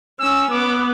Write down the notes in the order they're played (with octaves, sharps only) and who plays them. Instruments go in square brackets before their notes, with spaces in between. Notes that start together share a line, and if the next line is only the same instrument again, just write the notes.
[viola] C#4 [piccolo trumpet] E6
[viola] B3 [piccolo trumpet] D6